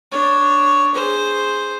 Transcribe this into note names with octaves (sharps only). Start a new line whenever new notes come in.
D4 C#5
G#4 C5